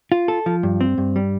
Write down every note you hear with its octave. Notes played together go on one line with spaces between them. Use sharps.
F4
A4
F3
G2
C4
G2
G3